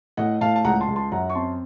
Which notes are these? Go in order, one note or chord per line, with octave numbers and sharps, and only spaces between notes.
A2 D#5 F#5
A2 F5 A5
A5
C#2 F#5 A#5
A5 C6
C#2
A5 C6
F#2 F#5 A#5
C#6
C4 A5 C6